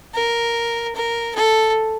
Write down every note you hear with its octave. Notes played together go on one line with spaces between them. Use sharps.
A#4
A#4
A4